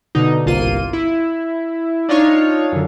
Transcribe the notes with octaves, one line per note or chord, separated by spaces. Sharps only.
B2 D3 D#4
G1 C2 A#3 F4 C6 D#7
E4
D4 D#4 F4 C#5 F5
F#2 D3